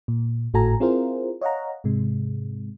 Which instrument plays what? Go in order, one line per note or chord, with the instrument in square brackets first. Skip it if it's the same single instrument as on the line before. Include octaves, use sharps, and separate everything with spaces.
[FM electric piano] A#2
G#1 A2 F#4 A4 G#5 A#5
C4 E4 F4 G#4 A#4 C5
C#5 D#5 F5 F#5 A#5
G#2 C3 G#3